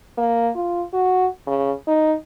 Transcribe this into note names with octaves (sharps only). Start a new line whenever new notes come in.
A#3
F4
F#4
C#3
D#4